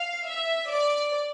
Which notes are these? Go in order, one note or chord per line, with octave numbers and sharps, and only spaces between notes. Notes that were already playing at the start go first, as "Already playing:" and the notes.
Already playing: F5
E5
D5